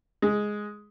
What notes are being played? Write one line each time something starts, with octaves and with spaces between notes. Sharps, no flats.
G#3